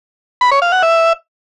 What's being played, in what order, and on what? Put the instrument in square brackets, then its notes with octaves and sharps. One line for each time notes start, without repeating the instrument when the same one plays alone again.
[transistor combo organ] B5
C#5
F5
F#5
E5